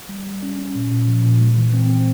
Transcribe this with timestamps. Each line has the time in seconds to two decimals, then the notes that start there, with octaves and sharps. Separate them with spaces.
0.09 G3
0.26 G3
0.43 C#4
0.59 C#4
0.75 A#2
0.92 A#2
1.08 F3
1.24 A#2
1.40 G#3
1.57 E3
1.74 C4
1.90 C4